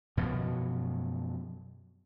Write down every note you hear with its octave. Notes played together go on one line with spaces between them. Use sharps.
F#2 B2 F3 F#3